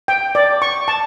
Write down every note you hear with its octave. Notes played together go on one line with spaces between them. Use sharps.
G5
D5
C#6
A5